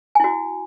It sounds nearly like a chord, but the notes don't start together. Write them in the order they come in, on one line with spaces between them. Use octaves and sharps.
G#5 E4 F#4